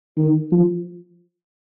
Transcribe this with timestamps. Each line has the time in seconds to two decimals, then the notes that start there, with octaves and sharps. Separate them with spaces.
0.18 D#3
0.52 F3